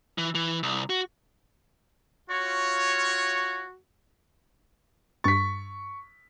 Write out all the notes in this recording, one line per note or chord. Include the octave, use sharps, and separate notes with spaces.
E3
E3
C2
F#4
F4 F#4 C#5
G2 C#6 A6 B6